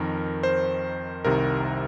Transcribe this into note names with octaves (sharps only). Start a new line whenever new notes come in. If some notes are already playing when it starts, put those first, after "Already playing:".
Already playing: F2 D#3 A#4
C5
C2 C3 D#3 A#4